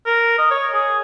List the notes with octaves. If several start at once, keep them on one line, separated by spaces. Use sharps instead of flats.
A#4
D#5
C#5
G#4